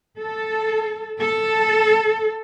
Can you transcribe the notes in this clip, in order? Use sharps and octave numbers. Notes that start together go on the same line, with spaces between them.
A4
A4